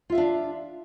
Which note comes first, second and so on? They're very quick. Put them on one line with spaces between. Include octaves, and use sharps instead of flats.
F4 E5 F5 D4